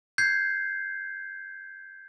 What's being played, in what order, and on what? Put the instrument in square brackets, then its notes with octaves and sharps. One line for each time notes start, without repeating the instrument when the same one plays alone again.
[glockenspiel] G6 G#6 C7